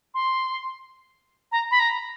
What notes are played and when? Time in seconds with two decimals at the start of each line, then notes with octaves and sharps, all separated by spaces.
0.14 C6
1.52 A#5
1.71 B5
1.80 A#5